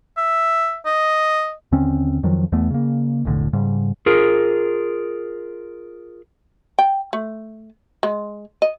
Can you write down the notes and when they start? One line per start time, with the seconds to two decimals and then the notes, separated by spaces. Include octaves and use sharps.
0.17 E5
0.86 D#5
1.72 D#2 D3 C4 C#4
2.23 F2 D#3 F3 F#3
2.52 E2 E3 A3 B3
2.70 C#3 A#3
3.25 E1 B1 A2 D3
3.53 G#2 C#3 G3
4.06 F4 G#4 A#4
6.79 G5
7.13 A3
8.03 G#3
8.62 D#5